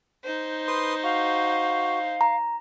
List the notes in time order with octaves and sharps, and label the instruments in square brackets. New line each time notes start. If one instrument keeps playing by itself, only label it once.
[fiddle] D#4 C5
[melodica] B4 C6 D#6
[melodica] F#4 [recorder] F5
[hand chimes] A#5